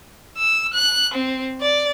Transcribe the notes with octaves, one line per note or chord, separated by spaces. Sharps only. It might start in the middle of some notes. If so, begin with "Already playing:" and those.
E6
F#6
C4
D5